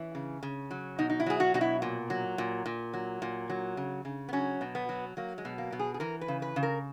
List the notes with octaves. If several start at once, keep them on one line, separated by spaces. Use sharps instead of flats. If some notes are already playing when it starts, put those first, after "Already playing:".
Already playing: E3 C#4
C#3
C#3
F#3
B2 D#4
D#4
E4
F#3 G#4
F#4
B2 F#4
E4
A#2
F#3
A#2
A#2
F#3
A#2
F#3
C#3
C#3
B3
F#3 C#4
B2
B3
F#3
F#3 A#3
G#3
B2
A#3
B2
G#4
G#4
E3 A#4
B4
C#3
B4
C#3
A#4